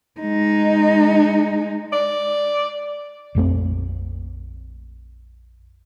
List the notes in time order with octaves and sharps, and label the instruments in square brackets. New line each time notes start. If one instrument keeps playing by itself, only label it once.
[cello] G#3 D#4
[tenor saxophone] D5
[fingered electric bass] A#1 F2 A3 C4